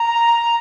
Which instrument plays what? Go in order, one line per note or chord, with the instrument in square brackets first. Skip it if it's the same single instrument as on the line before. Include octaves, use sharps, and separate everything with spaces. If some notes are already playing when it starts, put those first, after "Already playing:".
Already playing: [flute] A#5